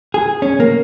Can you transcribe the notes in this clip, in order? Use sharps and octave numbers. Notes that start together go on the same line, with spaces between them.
G#4
C#4
A#3